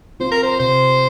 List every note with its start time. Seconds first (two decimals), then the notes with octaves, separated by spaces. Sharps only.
0.20 C4 F4 C5
0.31 A#4
0.43 C5
0.59 C3 C5